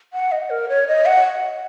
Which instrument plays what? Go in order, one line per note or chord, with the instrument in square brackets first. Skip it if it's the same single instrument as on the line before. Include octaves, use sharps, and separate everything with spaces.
[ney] F#5
D#5
A#4
C#5
D#5
F#5